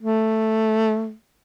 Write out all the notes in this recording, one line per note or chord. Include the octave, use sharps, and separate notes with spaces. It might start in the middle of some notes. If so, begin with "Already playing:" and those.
A3